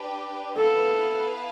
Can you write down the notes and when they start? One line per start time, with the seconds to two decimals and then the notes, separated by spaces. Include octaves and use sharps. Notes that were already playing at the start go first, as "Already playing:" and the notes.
Already playing: D4 G4 B4
0.57 B3 E4 A4 B4 F5 A5